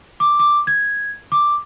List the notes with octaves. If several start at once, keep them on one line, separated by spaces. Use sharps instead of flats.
D6
D6
G#6
D6